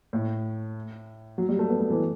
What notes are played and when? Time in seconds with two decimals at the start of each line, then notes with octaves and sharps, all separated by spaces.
0.13 A2
1.38 F#3
1.49 G3
1.59 A3
1.69 B3
1.80 A3
1.90 E3